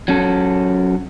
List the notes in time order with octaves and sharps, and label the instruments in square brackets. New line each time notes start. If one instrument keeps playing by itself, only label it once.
[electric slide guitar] F#3 C#4 A4